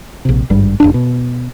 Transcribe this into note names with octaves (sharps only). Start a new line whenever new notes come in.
A#1 C3
G#1 G2 G3
F1 C2 D4
B2